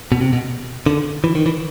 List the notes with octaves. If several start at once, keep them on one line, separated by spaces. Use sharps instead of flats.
B2
C3
B2
D3
E3
D#3
E3